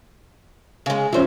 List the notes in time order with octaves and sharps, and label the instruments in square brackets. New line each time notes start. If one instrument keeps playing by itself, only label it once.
[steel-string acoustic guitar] C#3 G#3
[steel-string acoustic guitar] E3 C5 [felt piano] F3 C#4